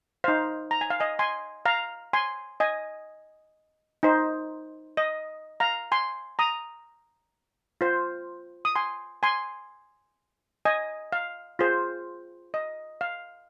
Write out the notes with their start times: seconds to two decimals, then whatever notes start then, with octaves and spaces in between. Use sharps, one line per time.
0.24 D#4 C5 F5
0.71 A#5
0.81 G#5
0.90 F5
1.00 D#5 G#5
1.19 G#5 C6
1.66 F5 A#5
2.13 G#5 C6
2.60 D#5 G#5
4.03 D#4 C5
4.97 D#5
5.60 F5 A#5
5.92 G#5 C6
6.39 A#5 D#6
7.81 F4 C5
8.65 D#6
8.75 G#5 C6
9.23 G#5 C6
10.65 D#5 G#5
11.12 F5
11.59 F4 G#4 C5
12.54 D#5
13.01 F5